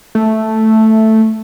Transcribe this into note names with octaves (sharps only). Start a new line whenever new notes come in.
A3